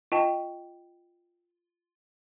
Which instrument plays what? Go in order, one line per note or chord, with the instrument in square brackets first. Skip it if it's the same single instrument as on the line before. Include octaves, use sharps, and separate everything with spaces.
[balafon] F4 D#5 G5 A5